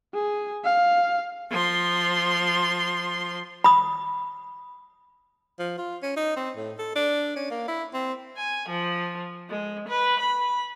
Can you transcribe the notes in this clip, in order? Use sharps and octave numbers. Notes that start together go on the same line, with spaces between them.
G#4
F5
F3 C6
B5 D#6
F3
F4
C#4
D#4
C4
A2
A4
D4
C#4
A#3
E4
C4
G#5
F3
G#3
B4
B5